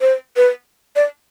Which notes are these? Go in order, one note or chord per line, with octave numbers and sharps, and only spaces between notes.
C5
B4
D5